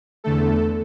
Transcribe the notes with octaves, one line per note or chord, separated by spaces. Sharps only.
E2 D3 A3 A4